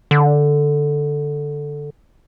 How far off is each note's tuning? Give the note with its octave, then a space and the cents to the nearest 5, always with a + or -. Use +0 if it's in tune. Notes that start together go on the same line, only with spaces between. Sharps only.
D3 +0